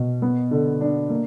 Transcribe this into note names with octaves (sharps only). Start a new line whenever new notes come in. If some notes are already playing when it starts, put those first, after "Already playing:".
Already playing: B2
B3
D3
D4
A#3